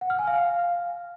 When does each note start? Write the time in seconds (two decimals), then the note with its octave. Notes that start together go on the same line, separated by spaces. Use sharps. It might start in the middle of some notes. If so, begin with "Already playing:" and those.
0.01 F#5
0.10 F6
0.19 G#5
0.27 F5